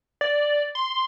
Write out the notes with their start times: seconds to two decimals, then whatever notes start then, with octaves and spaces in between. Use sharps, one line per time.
0.21 D5
0.75 C6